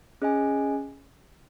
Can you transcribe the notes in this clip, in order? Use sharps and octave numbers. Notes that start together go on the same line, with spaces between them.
C#4 G#4 D#5 G#5